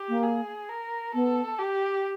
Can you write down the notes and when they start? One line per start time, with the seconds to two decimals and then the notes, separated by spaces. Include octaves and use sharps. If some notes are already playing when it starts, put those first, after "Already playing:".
Already playing: G4
0.08 A#3
0.23 G#4
0.69 A#4
1.13 B3 A4
1.59 G4